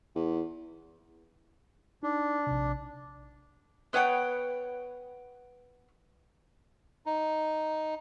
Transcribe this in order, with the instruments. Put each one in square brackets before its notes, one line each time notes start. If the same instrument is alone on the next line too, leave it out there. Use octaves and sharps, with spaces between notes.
[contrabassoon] E2
[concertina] D4 [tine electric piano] D#4
[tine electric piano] A#1 C3
[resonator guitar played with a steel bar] B3 B4 C#5 F#5 G5
[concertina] D#4